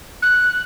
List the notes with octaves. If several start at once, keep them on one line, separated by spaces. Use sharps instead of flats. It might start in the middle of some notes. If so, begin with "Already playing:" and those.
F#6